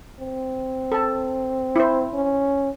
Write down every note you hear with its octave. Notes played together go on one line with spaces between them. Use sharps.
C4
A4 A5
E4 C5
C#4